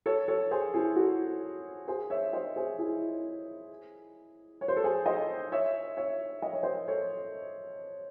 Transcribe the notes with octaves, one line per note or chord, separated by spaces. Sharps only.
A4 C#5
A4 C#5
G#4 C5
E4 G#4
F#4 A4
G#4 C5
C#5 E5
C5 D#5
G#4 C5
E4 G#4
C#5
C5
A4
G#4 C5
C5 D#5
C#5 E5
C#5 E5
D#5
C#5
C5 D#5
A4 C#5